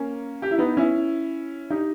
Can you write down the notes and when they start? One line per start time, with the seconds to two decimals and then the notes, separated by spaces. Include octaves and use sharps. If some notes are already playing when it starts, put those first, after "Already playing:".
Already playing: A#3 C#4
0.42 G4
0.51 E4
0.58 B3 D#4
0.77 C#4 E4
1.70 D#4 G4